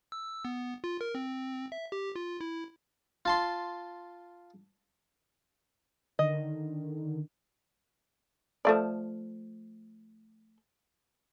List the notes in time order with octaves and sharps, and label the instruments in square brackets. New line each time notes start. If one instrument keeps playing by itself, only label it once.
[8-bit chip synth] E6
B3
F4
A#4
C4
E5
G4
F4
E4
[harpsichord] F4 A5 C6
[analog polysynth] D3 D#3 [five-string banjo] D#5
[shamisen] F3 A3 D5